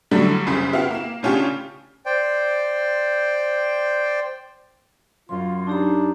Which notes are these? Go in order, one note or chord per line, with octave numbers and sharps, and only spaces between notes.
A2 D3 F#3 G3 A3
F#1 C2 F#2 C#3
B3 E4 F#4 F5 G5
A#3 E7
A2 C#3 C#4 D4 F4 G4
C5 D5 G5
F#2 F4 C6
D4 D#4 G4 A#5